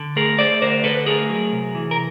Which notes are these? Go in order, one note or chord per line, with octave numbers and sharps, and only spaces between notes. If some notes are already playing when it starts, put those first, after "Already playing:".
Already playing: D3
A3 G#4 A#4
A3 C5 D5
D3 A#4 C5
D3 A4 B4
A3 G#4 A#4
F#3
C3
E3
A#4